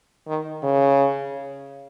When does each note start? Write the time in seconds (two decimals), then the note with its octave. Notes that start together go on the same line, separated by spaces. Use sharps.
0.27 D#3
0.63 C#3